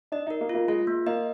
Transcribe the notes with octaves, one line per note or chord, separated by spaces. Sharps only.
D4 D#5
D#4 A#4
A#3
F4
A#3
G#3 F4
A#3
A#3 D#5